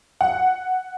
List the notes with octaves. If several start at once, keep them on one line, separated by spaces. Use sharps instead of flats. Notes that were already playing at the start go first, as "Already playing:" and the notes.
F#5